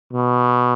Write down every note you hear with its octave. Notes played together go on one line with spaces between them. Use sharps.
B2